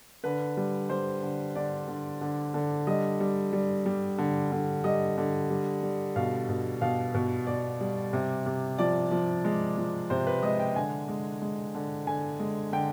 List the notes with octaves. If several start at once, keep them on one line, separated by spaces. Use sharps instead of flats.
D3 B4
G3
G3 C5
D3
D3 D5
D3
D3
D3
G3 D#5
G3
G3
G3
D3
D3
G3 D#5
D3
G3
G3
B2 F5
B2
B2 F5
B2
B2 D5
G3
C3
C3
F3 D5
F3
G#3
F3
C3 C5
B4
G#3 D#5
G5
D3 G#5
G#3
G#3
D3
D3 G#5
G#3
D3 G5